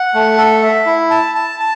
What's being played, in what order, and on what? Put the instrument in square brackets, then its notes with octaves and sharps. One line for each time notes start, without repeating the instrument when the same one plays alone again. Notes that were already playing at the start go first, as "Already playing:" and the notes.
Already playing: [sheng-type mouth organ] F#5
A3
A4
E5
E4
A5
A5
A5